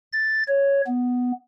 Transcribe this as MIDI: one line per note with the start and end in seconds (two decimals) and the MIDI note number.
0.12 0.43 93
0.47 0.81 73
0.87 1.32 59